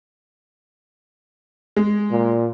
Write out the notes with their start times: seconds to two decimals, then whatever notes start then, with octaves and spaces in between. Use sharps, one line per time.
1.76 G#3
2.11 A#2